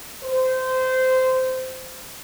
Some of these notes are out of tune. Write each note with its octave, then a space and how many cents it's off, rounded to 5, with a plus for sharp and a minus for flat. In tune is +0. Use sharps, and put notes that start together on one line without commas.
C5 -20